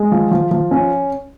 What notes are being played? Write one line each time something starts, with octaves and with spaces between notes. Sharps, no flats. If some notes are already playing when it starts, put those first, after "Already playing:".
Already playing: G#3
F3
F3
F3
C#4